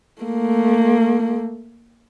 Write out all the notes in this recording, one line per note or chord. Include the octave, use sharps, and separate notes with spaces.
A3 A#3